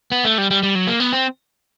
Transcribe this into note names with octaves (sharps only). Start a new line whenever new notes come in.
B3
A3
G3
G3
G3
F#3
A#3
B3
C4